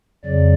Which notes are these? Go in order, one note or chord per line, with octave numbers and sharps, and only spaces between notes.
F2 C#3 F#3 D5